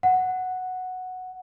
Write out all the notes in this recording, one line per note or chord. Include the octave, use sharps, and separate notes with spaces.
F#5